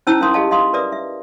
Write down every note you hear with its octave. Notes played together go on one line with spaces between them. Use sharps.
C#4 D#4 E4 C5 A5 E6
C#4 A#4 F5 C6 D#6
G4 G#4 D#5 F5 A5
D#5 F5 C6 D#6
A#4 B4 D5 E5 D6 D#6
E5